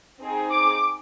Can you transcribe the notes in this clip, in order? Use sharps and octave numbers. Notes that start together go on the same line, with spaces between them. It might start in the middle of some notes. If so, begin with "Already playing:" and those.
C4 D#4 G#4
D6